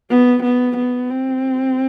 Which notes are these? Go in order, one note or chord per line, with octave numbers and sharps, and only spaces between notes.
B3
B3
B3
C4